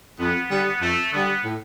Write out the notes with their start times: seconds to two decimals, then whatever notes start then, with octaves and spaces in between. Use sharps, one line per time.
0.19 F2 B3
0.51 D3 G3 B3
0.81 F2 A3
1.12 D3 G3 B3
1.44 A2